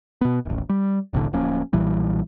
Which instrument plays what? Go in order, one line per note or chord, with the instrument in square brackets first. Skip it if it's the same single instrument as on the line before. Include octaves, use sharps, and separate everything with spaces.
[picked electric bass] B2 B3
D#1 A1
G3
F1 C2 A2 D3
D1 F3 A#3 C#4
B1 A#2 E3 G3